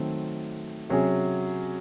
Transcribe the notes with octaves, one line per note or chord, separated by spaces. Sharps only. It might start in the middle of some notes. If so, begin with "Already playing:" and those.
Already playing: D#3 F#3 A3 C4
C3 F#3 C#4 G#4